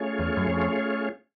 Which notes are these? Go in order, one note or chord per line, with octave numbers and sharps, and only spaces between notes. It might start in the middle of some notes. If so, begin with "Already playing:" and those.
Already playing: A3 C#4 F4 G#4 C#5
E2
F#2
F2